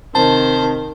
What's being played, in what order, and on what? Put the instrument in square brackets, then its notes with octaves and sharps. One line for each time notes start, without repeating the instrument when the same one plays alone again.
[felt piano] C3 [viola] D#3 [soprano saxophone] C5 [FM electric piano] A5